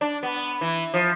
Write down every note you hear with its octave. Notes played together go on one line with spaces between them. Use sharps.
D4
B3
E3
F3